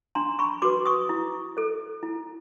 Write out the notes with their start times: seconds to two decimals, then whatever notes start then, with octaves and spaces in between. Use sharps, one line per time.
0.15 D4 A#5 C6
0.39 B5 C#6
0.62 F#4 B4 C6 D6
0.85 C#6 D#6
1.09 E4
1.57 A4 C5
2.03 E4